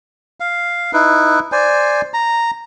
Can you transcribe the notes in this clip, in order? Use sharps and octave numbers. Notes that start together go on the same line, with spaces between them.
F5
D#4 E4 B4
C5 D5 G#5
A#5